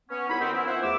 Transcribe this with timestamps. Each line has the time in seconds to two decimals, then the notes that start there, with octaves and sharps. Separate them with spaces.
0.09 B3 C#4
0.28 C2 F#3 D#4 E4 B5
0.39 D#3 B3 C4
0.53 E3 F3 B3 C#4 E4
0.66 F4 C5 E5 F#5
0.82 E2 A3 D6 E6